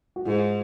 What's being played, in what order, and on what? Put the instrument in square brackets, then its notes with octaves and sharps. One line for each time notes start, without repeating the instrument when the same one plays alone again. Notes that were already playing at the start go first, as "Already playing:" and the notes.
[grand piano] F#4
[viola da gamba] G#2 [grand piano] F4 G#4